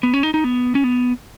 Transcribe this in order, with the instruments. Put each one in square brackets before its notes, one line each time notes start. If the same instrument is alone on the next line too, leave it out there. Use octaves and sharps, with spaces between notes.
[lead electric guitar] B3
C#4
D#4
D#4
B3
C#4
B3